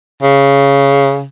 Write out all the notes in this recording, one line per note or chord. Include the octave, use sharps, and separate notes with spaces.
C#3